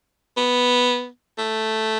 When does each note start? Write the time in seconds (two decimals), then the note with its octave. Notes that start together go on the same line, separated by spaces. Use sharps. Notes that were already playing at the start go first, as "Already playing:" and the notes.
0.37 B3
1.38 A3